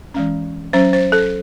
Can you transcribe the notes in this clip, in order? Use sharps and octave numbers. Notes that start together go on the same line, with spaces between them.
E3 G#3 C#4
F#3 C#4 C5
C5
A4